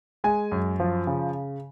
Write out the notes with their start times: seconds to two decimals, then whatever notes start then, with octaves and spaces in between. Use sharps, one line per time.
0.24 G#3 G#5
0.52 F#2
0.80 F3
1.07 C#3